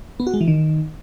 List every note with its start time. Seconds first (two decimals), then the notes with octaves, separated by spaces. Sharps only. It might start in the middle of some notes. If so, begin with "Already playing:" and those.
0.20 B3
0.27 F#4
0.34 G#3
0.41 E3
0.48 D#3